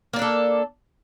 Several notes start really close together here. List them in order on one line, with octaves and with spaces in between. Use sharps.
A#3 D5 D4 A4